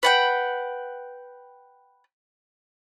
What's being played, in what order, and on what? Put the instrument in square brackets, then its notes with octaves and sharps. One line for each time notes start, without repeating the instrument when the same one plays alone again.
[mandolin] B4 F#5 G5